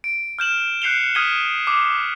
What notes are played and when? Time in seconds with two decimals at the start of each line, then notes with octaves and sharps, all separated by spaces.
0.04 D7
0.39 F6 G6 E7 F#7
0.82 F#6 G6 C7 C#7 F7 G7
1.15 D#6 F6 G#6 B6 D#7 G7
1.67 D6 D#6